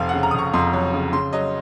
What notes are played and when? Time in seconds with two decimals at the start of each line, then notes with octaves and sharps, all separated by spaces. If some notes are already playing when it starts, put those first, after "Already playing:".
Already playing: F1 C4 F5
0.09 C#3 F#5
0.23 A#5
0.31 D#6
0.34 F1 C#6
0.54 F2 C6
0.73 F#3
0.93 C#3
1.13 C#3 C6
1.33 F#3 D#5